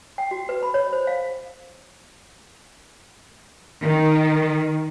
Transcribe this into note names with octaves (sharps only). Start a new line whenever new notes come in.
G5
F#4
B4
B5
C#5
C5
F5
D#3